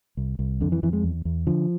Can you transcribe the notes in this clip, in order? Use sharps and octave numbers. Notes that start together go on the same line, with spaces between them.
C2
C2
F2 D3
E3
F2 E3
G#3
E2
E2
D3 F3